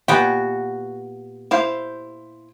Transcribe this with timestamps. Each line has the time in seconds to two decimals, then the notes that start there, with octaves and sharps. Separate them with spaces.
0.08 A#2 B3 F#4 G4
1.51 E4 C5 F5